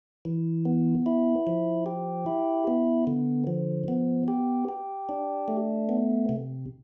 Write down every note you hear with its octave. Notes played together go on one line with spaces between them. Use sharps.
E3
B3
E4
F3
G4
E4
B3
D3
F3
B3
G4
G4
D4
A3
B3
C3